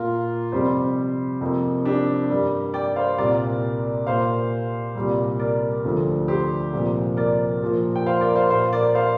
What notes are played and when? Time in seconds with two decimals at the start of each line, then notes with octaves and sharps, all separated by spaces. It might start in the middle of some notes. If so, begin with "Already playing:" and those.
Already playing: A#2 A#3 F4 A#4
0.52 F2 C3 G3 G4 C5
1.41 F2 C3 F3 A#3
1.85 D4 G4
2.29 G2 G3 A#3
2.74 D5 G5
2.96 C5 F5
3.18 C2 A#2 A#3 A#4 D5
4.07 A#2 A#3 C5 F5
4.95 C2 A#2 G3
5.39 A#4 D5
5.84 D2 D3 F3
6.28 G4 C5
6.73 C2 A#2 F3 A#3
7.17 A#4 D5
7.62 A#2 F3 A#3
7.96 G5
8.06 C5 F5
8.21 A#4 D5
8.35 C5 F5
8.50 A#2 A#3 C5 F5
8.73 A#4 D5
8.95 C5 F5